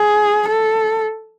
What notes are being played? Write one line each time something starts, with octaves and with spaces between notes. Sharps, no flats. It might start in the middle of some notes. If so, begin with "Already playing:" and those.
Already playing: G#4
A4